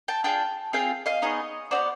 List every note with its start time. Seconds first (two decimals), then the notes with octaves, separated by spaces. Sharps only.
0.08 G5 A5
0.24 D4 F4 G#4 G5 A5
0.73 C4 F4 G#4 F5 G5
1.06 D#5 F5
1.22 B3 D#4 G#4 C#5 D#5
1.71 B3 D#4 F#4 C5 D5